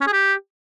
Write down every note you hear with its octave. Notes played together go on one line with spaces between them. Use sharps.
C#4
G#4
G4